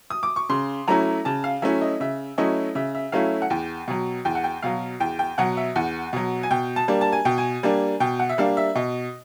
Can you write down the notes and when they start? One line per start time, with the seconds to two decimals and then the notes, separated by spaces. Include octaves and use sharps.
0.10 D#6
0.23 D6
0.36 C#6
0.49 C#3 C6
0.88 F#3 A3 C#4 E4 A#5
1.25 C#3 A5
1.44 F5
1.62 F#3 A3 C#4 E4 E5
1.81 D#5
2.00 C#3 E5
2.38 F#3 A3 C#4 E4 D#5
2.75 C#3 E5
2.95 E5
3.12 F#3 A3 C#4 E4 F5
3.42 F#5
3.50 E2 G5
3.88 B2 F#3
4.25 E2 G5
4.35 F#5
4.44 G5
4.62 B2 F#3 F5
5.00 E2 G5
5.19 G5
5.38 B2 F#3 F#5
5.57 E5
5.76 E2 F#5
6.13 B2 F#3
6.43 G#5
6.50 B2 G5
6.76 A5
6.88 G3 A#3 D4
7.01 A5
7.13 G#5
7.25 B2 G5
7.38 G#5
7.63 G3 A#3 D4
8.00 B2 G5
8.19 F#5
8.29 E5
8.38 G3 A#3 D4 F5
8.57 E5
8.75 B2 D#5